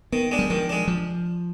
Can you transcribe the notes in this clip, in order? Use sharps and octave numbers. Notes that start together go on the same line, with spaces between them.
D#3 B3
G#3 D4
G3
D#3 F3
G#3 D4
F3